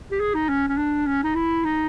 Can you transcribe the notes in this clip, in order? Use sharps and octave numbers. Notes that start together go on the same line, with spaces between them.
G4
G#4
D#4
C#4
C#4
D4
C#4
D#4
E4
D#4